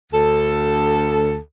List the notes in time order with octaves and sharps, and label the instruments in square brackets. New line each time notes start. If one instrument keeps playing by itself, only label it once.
[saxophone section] D2 A4